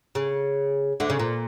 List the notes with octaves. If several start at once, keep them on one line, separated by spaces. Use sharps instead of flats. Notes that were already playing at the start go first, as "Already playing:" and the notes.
C#3
D2 D3
C#3
A#2